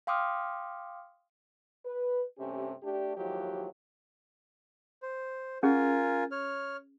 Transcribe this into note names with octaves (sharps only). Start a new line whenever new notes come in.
F5 G5 C6 D6 D#6 F6
B4
G2 C3 A3 C#4 G4
A3 D4 G4
D#2 F3 F#3 G#3 E4 G4
C5
C#4 F4 G#4 A#4 G#5
C#5 F6